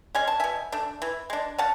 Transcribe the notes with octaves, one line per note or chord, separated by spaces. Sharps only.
G#3 C#4 G#5
A5
B2 E5 G#5
A3 D4
E3
G#3 D4
C#3 F#5 A5